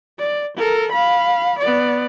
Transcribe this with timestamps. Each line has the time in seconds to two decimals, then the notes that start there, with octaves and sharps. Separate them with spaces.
0.19 D5
0.57 A4 A#4
0.91 F5 B5
1.59 B3 D5